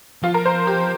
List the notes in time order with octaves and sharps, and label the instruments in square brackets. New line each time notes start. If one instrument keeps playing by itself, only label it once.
[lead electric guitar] F3 [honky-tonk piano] F4
[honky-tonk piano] A#4
C5
G4